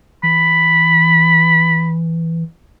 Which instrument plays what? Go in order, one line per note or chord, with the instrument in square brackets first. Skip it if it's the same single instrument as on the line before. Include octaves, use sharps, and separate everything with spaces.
[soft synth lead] E3 [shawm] B5